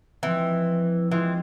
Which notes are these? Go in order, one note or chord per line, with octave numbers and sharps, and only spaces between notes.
E3 F3 G#3 C4
E3 G#3 C4 F4 G#4